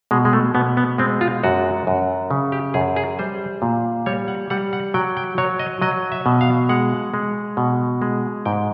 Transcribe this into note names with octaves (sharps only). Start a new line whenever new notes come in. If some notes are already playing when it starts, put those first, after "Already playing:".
B2 G#3
G#3
A3
B2 B3
B3
G#3 C4
F4
F#2 F#4
F#2
C#3
G4
F#2 G#4
G#4
G3 C5
A#2
G3 C#5
F#5
G3 F#5
F#5
F#3 G5
G5
F#3 C#5
D#5
F#3 D#5
E5
B2
F5
G#3 F#5
G#3
B2
G#3
G#2 G5